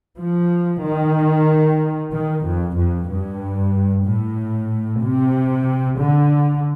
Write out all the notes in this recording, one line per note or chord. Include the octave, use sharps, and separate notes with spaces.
F3
D#3
D#3
F2
F2
G2
A2
C3
D3